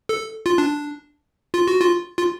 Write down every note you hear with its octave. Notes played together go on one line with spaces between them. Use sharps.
A4
F4
D4
F4
F#4
F4
F4